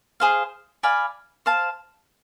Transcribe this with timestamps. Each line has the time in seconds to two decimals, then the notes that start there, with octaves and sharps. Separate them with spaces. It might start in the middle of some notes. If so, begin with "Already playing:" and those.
0.20 G#4 C5 F5
0.83 D5 F5 G#5 B5
1.46 C5 F5 A5